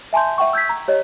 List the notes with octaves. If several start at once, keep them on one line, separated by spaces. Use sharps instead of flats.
E5 G#5 A5 C6 G6
E5 F#5 G5 C#6
E6 G6 G#6 B6
A#5
G4 C#5 D#5